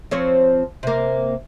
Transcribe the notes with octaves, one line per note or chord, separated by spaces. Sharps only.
F3 C4 C#5
C3 A#3